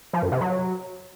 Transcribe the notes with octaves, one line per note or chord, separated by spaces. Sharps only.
F3
F#2
C3
F#3